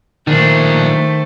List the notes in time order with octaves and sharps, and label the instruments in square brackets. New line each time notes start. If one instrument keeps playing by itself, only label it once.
[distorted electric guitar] A#2 D4 [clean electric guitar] D#3 [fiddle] A3 C5